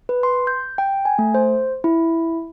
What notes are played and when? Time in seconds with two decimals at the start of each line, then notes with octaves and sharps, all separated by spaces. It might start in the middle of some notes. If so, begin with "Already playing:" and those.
0.09 B4
0.23 C6
0.47 G6
0.78 G5
1.05 G#5
1.19 A3
1.34 C5
1.84 E4